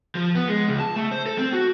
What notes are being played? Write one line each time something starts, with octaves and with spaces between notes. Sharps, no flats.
F3
B3
G#3
C#2
A5
A3
C5
A4
C4
F#4